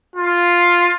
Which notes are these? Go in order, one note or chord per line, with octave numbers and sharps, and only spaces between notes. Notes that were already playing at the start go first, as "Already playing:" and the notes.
F4